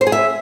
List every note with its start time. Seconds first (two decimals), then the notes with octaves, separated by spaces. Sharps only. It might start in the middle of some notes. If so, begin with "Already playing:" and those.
0.01 C5
0.07 G#4
0.12 E5